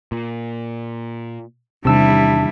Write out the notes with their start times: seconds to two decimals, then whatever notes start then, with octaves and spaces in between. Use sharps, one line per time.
0.12 A#2
1.85 E2 C3 D#3 G3 D4 E4 E6